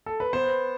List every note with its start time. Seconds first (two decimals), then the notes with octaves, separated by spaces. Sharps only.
0.06 A4
0.20 B4
0.33 B3 C5